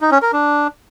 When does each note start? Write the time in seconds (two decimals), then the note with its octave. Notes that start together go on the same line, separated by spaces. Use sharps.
0.01 D#4
0.11 C#4
0.22 A#4
0.33 D4